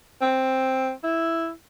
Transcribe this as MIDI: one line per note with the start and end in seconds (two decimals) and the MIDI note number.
0.22 0.92 60
1.04 1.51 64